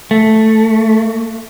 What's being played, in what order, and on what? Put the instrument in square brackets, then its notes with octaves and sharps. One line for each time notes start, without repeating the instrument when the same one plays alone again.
[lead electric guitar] A3